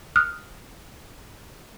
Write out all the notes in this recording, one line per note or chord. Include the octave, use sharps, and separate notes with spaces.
D#6 F6 F#6